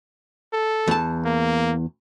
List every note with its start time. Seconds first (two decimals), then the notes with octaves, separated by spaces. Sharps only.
0.53 A4
0.88 E2 A5
1.25 A#3